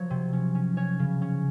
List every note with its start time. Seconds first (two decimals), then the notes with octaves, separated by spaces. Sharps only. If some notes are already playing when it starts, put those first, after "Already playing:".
Already playing: F3 F#3 C#5
0.10 C3
0.33 C#4
0.55 C#4
0.77 C#4 C#5
0.99 C#3
1.22 C#4